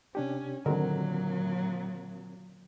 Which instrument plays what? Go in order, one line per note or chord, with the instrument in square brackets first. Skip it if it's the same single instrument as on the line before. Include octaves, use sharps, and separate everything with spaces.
[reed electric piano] C3 D4 G4 [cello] C#4
[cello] A#2 F#3 [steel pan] D3 D#3 [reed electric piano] C4 F#4 A#4